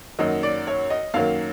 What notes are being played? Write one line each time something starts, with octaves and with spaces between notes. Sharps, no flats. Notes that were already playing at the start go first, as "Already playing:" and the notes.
F#2 D#3 F#3 A#3 D#5
D5
C#5
D#5
F#2 D#3 F#3 A#3 F5